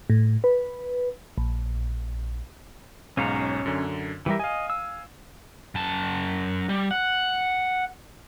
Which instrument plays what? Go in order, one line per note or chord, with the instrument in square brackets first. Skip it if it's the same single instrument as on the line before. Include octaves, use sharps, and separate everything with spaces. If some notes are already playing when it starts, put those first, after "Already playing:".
[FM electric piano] A2
B4
A#1
[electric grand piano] B1 G#2 F5 [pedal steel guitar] C#4 C#5 A#5
[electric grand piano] F#2 D3
[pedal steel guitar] E3 G3 A#4 [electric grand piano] G4 E5
[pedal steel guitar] D#5 [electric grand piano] F5 G#5
[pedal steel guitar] E6
[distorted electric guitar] F#2 A5
G3
F#5